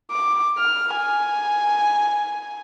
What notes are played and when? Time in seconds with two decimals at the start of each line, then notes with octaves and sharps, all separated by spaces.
0.11 D6
0.58 F6
0.96 G#5